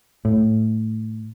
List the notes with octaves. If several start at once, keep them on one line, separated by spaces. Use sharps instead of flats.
A2